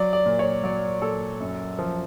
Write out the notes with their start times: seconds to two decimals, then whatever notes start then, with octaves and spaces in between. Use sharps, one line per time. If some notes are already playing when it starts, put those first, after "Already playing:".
Already playing: F#3 D5
0.13 D5
0.26 A#2
0.39 C#5
0.63 F#3 D5
1.02 A#2 A4
1.40 F#2
1.79 F3